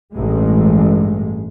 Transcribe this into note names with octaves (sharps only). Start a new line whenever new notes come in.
A1 G2 G#3